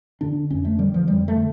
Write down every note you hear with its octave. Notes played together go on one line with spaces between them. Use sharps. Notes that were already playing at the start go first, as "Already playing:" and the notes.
D3 D4
F2 C#4
A3
D3 G3
F3
F2 G3
A3
D3